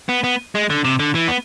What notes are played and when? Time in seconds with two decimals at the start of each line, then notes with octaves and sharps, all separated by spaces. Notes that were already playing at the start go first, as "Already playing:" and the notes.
0.09 B3
0.24 B3
0.55 G#3
0.70 D3
0.84 C3
0.99 D3
1.15 E3
1.28 B3